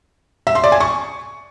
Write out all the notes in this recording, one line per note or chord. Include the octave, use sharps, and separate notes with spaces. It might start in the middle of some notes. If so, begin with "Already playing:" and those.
E5
C6
D5
G#5
C#6